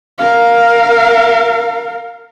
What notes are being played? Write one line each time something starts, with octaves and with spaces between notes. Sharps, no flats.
A#4 F5